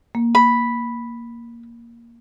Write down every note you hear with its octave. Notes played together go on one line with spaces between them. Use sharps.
A#3
B5